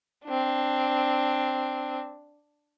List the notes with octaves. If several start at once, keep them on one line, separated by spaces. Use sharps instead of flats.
C4 D4